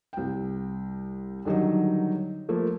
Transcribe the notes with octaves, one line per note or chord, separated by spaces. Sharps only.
C2 G5
D3 D#3 F#3 G3 D#4
F3 A3 A#3